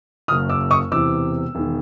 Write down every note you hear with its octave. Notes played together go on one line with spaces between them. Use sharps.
F#1 F#2 C#3 D#6 F6
D6 E6
C#6 D#6
E1 E2 C3 E3 D6 E6
E1 D#3